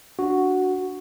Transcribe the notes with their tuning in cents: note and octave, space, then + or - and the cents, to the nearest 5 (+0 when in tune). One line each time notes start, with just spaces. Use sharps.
D4 +0 F#4 +0